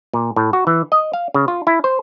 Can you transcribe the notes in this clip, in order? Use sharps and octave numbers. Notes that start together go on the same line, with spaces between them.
A#2
A2
F#4
E3
D#5
F5
C#3
F4
E4
C5